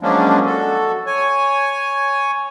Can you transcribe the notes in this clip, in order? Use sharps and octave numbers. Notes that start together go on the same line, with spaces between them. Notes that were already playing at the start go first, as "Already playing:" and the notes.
F3 F#3 G#3 A#3 C#4 D4
F#4 A4
C#5 G#5